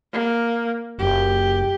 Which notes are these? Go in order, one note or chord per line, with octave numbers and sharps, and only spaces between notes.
A#3
F#1 G4